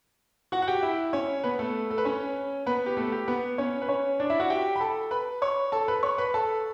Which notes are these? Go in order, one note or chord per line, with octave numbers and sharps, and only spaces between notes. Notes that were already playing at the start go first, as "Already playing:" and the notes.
F#4 F#5
F#5
G4 G5
E4 E5
C#4 C#5
B3 B4
A3 A4
A4
B4
C#4 C#5
B3 B4
G4
A3 A4
G4
B3 B4
C#4 C#5
B4
C#4 C#5
D4 D5
E4 E5
F#4 F#5
G4 G5
B5
A4 A5
B4 B5
C#5 C#6
A4 A5
B4 B5
C#5 C#6
B4 B5
A4 A5